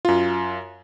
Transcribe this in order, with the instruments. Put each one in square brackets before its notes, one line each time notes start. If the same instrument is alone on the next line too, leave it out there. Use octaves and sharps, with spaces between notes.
[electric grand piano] F#2 F4